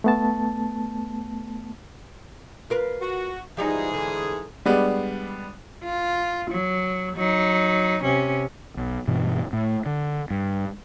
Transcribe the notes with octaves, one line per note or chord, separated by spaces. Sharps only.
A3 B3 A5
F4 A#4 B4
F#4
G#2 E3 F3 G3 D#4 G#4
D3
G3 G#3 B3 D4
F4
F#3
F#3 D#4
C3 C#4
B1
G2 B2 E3
A2
D3
G2